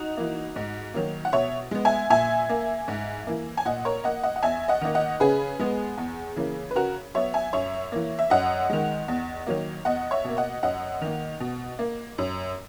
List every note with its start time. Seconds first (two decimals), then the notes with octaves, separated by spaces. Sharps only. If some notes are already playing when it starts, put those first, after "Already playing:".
Already playing: D#4 F#4
0.17 E3 A#3
0.56 G#2
0.94 D#3 F#3 A#3
1.25 F#5
1.33 B2 C#5 E5
1.71 G#3 B3
1.85 E5 G#5
2.10 A#2 E5 G#5
2.49 A#3
2.88 G#2
3.27 E3 A#3
3.57 G#5
3.65 A#2 D#5 F#5
3.85 A#4 C#5
4.04 A#3 D#5 F#5
4.23 D#5 F#5
4.36 F#5
4.43 E2 E5 G#5
4.68 D#5 F#5
4.81 D#3 A#3
4.95 D#5 F#5
5.20 C#3 G#4 B4
5.59 G#3 B3
5.98 E2
6.36 C#3 E3 A#3
6.71 B4
6.75 C#3 F#4 A#4
7.14 F#3 B3 C#5 E5
7.34 E5 G#5
7.53 F#2 C#5 E5
7.92 E3 A#3
8.19 E5
8.30 F#2 D#5 F#5
8.70 D#3 G#3
9.08 E2
9.47 D#3 F#3 A#3
9.85 E2 D#5 F#5
10.11 C#5 E5
10.24 B2 A#3
10.37 D#5 F#5
10.63 F#2 D#5 F#5
11.01 D#3 A#3
11.40 B2
11.79 A#3
12.18 F#2